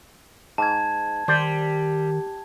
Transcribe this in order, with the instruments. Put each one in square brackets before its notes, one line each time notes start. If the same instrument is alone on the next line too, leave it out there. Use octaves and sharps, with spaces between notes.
[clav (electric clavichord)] G#2 [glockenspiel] A5 G#6
[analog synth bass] D#3 [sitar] G3 [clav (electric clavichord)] C5 D5